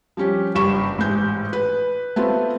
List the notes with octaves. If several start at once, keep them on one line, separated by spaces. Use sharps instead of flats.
F3 G3 C#4 G4
F#1 G2 G4 C#6 E7
A1 G#2 G#3 G6
B4
A3 B3 C4 F4